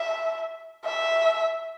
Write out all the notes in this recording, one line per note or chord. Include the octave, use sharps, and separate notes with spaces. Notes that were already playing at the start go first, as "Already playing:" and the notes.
Already playing: E5
E5